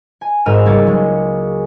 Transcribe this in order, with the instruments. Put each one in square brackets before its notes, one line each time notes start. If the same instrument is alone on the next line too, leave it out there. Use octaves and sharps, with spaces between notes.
[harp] G#5
G#1 G#2 A#4 E6 F6 D#7
C#2 G3 A#3 C#4 G#6 A6
F#3 G#3